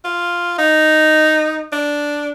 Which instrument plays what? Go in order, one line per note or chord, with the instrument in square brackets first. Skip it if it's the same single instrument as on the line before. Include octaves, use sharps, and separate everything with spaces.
[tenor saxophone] F4
D#4
D4